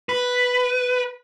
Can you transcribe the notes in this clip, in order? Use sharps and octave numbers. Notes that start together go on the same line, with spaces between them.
B4